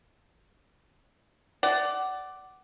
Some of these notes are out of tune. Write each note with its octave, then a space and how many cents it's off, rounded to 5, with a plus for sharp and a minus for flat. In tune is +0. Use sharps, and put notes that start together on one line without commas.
D5 +0 F#5 +25